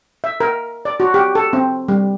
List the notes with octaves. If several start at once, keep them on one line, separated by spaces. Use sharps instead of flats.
E5
A#4
D5
F#4
G4
A4
C4
G3